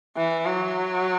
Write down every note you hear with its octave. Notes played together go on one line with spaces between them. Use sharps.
E3
F#3